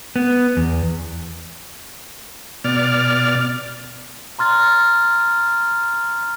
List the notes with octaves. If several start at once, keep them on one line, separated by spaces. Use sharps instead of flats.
B3
E2
B2 D5 F6
A#5 C6 F6 A6